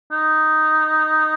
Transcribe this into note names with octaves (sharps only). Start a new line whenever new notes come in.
D#4